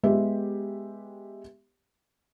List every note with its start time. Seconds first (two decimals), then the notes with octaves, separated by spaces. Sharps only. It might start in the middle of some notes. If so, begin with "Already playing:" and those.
0.03 G#3 B3 G4 E5